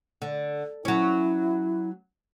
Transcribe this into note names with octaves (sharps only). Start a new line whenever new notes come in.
D3
F#3 C#4 E4